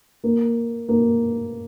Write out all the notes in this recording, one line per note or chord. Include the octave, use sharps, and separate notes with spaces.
A#3
A#3